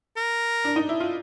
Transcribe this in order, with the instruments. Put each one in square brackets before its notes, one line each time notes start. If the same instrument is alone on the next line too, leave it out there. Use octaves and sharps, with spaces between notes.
[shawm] A#4
[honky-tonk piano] D4
D#4
E4
F4